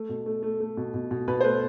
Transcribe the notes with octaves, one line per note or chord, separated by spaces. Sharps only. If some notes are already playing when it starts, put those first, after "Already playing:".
Already playing: A3
B2
A3
A3
A3
B2
B2
B2
B2 B4
C5
A3 B4